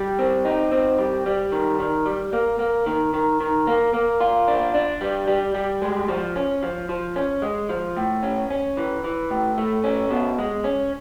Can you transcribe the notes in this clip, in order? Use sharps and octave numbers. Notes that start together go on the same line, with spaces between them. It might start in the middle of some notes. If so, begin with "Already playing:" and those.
Already playing: G3
C4
D#4
C4
G3
G3
D#3
D#3
G3
A#3
A#3
D#3
D#3
D#3
A#3
A#3
F4
D4
D4
G3
G3
G3
G#3
F3
C#4
F3
F3
C#4
G#3
F3
A2
C#4
C#4
E3
E3
A2
A3
C#4
B2
G#3
C#4